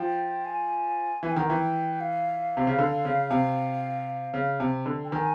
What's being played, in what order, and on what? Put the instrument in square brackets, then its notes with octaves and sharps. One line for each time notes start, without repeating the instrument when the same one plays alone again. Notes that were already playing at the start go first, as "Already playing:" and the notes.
Already playing: [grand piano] F3 [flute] G5
[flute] G#5
[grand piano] E3 [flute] G#5
[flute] G5
[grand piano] D#3 [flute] F#5
[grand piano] E3 [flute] G5
[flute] F5
[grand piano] C3
C#3
D3
C#3
C3
C#3
C3
D3
[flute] G5
[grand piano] D#3 [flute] G#5